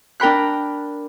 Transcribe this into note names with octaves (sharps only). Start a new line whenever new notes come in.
D4 A#4 G5 B5 F#6